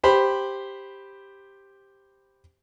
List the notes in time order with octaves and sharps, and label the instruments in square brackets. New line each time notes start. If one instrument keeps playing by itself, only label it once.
[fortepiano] G4 C5 B5